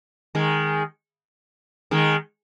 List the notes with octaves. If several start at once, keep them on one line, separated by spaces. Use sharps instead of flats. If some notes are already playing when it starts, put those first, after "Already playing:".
D#3 G#3
D#3 G#3